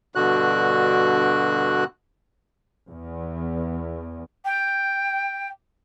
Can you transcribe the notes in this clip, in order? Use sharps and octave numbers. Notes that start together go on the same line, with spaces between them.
G2 B2 D3 F#4 F#6
E2
G5